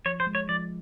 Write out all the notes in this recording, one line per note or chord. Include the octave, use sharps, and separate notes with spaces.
F3 C#5
C5
G#3
C#5
F3 D5